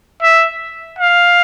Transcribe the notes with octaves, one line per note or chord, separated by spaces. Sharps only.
E5
F5